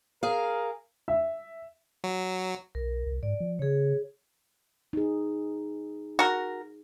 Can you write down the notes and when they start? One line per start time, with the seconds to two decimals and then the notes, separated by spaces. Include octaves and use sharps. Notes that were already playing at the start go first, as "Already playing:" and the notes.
0.23 G#4 A#4 F5
1.08 E5
2.04 F#3
2.75 B1 A#4
3.07 C2
3.23 G#2 D5
3.40 F3
3.59 C#3 G#4 C#5
4.93 D#4 G#4
6.19 F#4 A#4